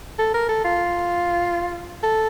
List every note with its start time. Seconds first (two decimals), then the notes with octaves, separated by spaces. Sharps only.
0.19 A4
0.34 A#4
0.49 A4
0.64 F4
2.03 A4